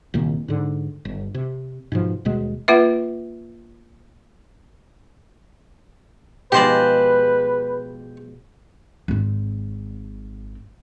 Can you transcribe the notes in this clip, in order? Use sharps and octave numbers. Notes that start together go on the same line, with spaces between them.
C2 A#2 D#3 A#3
G#2 D3
G1
C3
G#2 B2 F3
D#1 B2 G#3
A#3 F4 B4 E5
B2 F3 G#3 G4 B4 C5 D5
G#1 C4